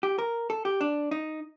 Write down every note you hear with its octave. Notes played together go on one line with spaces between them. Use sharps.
G4
A#4
A4
G4
D4
D#4